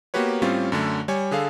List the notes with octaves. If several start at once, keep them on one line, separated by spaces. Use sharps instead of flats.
A#3 B3 F#4 G4 B4 C#5
A2 G3 C4 C#4 F4
F#2 D3 A3
G3 C#5 G#5
D3 G#4 A4 F5